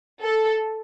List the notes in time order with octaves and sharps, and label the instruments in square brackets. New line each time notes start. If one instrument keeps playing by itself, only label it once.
[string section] A4